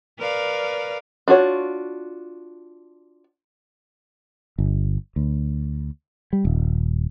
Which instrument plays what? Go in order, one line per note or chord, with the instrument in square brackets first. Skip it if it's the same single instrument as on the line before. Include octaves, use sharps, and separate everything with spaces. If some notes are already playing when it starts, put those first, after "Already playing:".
[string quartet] A#4 B4 D5 F5
[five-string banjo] D4 F4 F#4 C#5
[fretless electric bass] G1
D2
G3
D#1